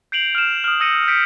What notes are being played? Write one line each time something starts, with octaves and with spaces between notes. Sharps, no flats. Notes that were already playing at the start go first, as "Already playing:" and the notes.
G6 C7 D7 F7 F#7
F6 E7
D#6 F6
D#6 E6 G6 A#6 C#7 D#7
G6 B6 C#7 D7